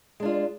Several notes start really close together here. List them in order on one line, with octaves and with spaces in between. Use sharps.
G#3 D4 F4